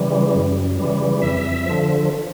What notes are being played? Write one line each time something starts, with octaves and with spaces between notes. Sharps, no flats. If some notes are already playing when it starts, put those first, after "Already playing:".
Already playing: C#3 E3 G3
F#2
C#3 E3 G3
F2 E5
D3 F3